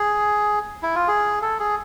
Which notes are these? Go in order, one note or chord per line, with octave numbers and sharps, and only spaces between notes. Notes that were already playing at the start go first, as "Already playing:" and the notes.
Already playing: G#4
E4
F4
G#4
A4
G#4